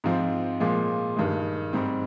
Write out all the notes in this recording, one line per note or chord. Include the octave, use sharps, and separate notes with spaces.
G#2 F3 C4 F4
A#2 F3 G#3
G2 D#3 G#3
G#2 G3 C4